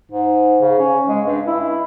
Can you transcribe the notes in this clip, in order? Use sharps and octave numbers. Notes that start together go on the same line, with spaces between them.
G#2
C#3
C#4
G#3
G2
E4